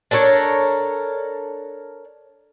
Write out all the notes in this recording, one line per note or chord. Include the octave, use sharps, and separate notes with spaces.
D4 A4 A#4 C#5